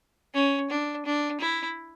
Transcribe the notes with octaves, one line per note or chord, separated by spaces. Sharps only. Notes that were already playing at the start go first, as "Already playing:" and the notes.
C#4
D4
D4
E4